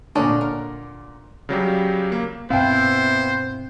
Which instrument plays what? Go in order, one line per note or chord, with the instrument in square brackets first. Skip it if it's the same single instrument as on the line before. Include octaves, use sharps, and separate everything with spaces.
[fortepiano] A#2 D3 [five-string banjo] C#4 D4 D#5
[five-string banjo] A#4
[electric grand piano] C#3 F#3 G3 G4
A#3
[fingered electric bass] G2 B2 C4 [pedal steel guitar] B3 E4 [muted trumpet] C5 [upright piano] F5 G5